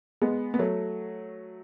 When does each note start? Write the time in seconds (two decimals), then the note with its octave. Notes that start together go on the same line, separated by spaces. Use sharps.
0.22 G#3 B3
0.54 B3
0.59 F#3 A3